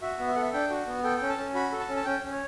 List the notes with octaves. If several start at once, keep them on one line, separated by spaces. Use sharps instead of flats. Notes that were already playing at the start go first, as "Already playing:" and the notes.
F#4 E5
B3
E5
A4 F#5
E5
D4 G5
F#4
B3
A4 G5
C#4 G5
A5
C#4
F#4 B5
A4
A5
C#4
A5
C#4 G5
C#4
C#5